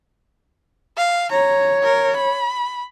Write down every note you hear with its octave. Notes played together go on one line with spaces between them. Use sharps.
F5
C#5 A#5
A#4
B5